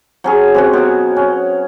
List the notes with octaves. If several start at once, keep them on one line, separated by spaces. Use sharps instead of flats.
F#3 C#4 G#4
C3 C#4 F#4
B2 F#3
C#4